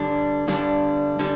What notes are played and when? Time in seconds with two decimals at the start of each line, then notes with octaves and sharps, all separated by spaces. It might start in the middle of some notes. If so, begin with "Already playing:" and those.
Already playing: G2 D3 G3 D4
0.48 G2 D3 G3 D4
1.19 D3 G3